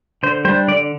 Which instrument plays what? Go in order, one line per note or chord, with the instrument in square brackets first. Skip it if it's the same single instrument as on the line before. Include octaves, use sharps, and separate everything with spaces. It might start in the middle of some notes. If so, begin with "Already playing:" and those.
[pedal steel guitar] D3 C5
G3 C5
D4
D3 D5